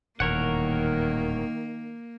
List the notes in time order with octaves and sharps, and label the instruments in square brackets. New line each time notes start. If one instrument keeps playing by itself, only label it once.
[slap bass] D#1 E2 A2 [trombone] D#3 [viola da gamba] A#3 [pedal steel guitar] A#4 C#5 F#5